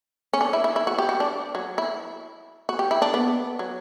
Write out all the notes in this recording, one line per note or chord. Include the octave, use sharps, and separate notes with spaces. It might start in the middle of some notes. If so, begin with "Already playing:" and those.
C#4
D4
E4
E4
E4
F#4
G4
F#4
D4
F#3
E4
F#4
G4
E4
D4
B3
F#3